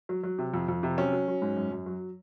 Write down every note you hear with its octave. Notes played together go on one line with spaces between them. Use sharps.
F#3
F#3
C3
F2
F2
C3
F#3 C#4
F#3
F#3
G#2
F#2
F#2
F#3